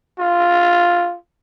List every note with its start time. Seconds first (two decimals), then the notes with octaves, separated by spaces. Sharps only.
0.19 F4